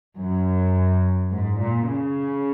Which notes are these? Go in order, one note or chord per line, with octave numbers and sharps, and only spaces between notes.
F#2
G#2
A#2
C#3